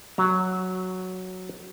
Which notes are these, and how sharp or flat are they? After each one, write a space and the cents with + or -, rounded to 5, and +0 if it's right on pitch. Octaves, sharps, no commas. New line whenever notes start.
F#3 +0 A#5 -10